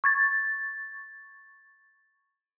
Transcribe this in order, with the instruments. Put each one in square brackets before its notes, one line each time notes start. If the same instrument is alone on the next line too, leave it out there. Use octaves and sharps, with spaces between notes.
[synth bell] C#6 G#6 A6